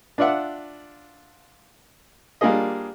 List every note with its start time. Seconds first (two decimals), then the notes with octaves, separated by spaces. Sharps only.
0.18 D4 F4 D5 E5 F#5
2.41 G3 A#3 D4 F4 G#4 D#5